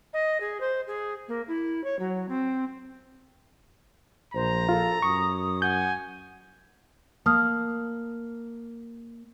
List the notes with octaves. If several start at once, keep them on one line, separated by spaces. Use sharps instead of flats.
D#5
G#4
C5
G#4
A#3
E4
C#5
F#3
C4
A#1 C5 A#5
F4 A4
F#2 C#6 D#6
F#5 G#5 G6
A#3 A5 D#6 F6